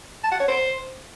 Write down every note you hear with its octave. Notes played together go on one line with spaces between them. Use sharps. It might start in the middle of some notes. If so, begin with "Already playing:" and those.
A5
F#5
C#5
C5